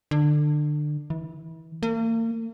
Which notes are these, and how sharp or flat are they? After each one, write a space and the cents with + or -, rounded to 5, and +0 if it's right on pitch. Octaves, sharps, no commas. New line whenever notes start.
D3 +25
E3 -30
A#3 -40